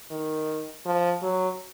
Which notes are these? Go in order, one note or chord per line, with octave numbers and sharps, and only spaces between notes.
D#3
F3
F#3